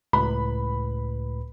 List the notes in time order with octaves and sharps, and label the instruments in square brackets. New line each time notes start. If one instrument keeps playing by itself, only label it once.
[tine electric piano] C#2 A2 B4 [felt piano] B5